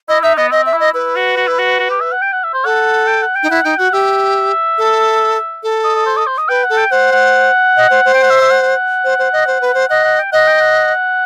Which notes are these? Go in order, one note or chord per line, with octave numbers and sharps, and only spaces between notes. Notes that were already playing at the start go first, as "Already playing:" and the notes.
E4 D#5
D#4 E5
B3 D#5
C4 D#5
E5
E4
D#5
E4 B4
F#4
F#4
E4
F#4
F#4
G4
E5
F#5
G5
F#5
E5
C5
A4 F#5
G5
F#5
G5
D#4
E4 F#5
D#4 G5
F#4 F#5
G4 E5
A4
A4
D#5
D#5
C5
D#5
C5
D#5
B4 G5
F#5
A4
G5
C5 F#5
F#5
D#5
C5
C5
G5
F#5
E5
E5
F#5
F#5
C5
C5
D#5
C5
B4
C5
D#5 F#5
F#5
G5
D#5 F#5
G5
F#5